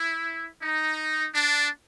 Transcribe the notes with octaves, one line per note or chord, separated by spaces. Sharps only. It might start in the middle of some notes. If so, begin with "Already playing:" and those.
Already playing: E4
D#4
D4